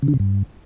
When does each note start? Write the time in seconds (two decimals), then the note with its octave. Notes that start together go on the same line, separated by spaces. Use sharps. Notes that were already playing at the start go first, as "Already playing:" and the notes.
0.02 C#3
0.08 D3
0.14 C3
0.19 G2